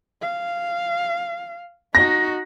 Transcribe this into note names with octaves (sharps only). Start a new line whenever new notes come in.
F5
D#4 F#4 A#6